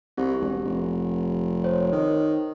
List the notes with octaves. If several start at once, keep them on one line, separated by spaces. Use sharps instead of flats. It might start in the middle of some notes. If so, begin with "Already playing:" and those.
C2 C4 G4
E1
F1
C5 C#5
D#3